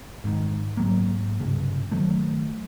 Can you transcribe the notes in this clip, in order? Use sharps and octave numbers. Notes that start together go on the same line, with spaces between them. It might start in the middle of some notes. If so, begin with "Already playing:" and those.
G#1 G#2 D3 D#3
G#2 F#3 A#3
C2 G2 C#3
D#3 F#3 A3